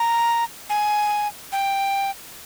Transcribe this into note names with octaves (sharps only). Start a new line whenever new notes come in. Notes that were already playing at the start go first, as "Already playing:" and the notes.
Already playing: A#5
G#5
G5